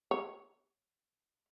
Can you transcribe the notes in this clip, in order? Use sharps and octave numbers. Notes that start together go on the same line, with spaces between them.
C#5